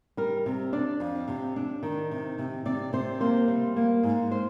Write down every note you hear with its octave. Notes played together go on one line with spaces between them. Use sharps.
G3 A#4
C3
D4 D5
F2
C3
D4
D#3
C3
C3
C3 D5
C3 C5
A#3 C5
G3
A#3
G#2
C5